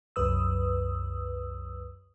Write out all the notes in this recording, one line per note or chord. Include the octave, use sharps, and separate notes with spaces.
C2 F#2 B4 D#6 E6